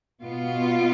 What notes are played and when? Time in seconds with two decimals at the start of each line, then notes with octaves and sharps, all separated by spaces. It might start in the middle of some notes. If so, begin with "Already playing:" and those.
0.22 B2 B3 F4